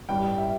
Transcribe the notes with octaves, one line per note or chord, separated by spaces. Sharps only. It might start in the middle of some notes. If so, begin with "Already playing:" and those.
A1 G2 G3 G5
E5